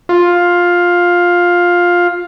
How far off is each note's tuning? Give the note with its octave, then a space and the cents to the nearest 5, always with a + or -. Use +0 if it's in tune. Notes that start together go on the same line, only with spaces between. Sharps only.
F4 +10